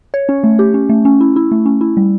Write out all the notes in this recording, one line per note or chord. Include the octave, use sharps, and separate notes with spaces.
C#5
C#4
A3
G4
C#4
A3
C#4
E4
E4
A3
C#4
E4
G3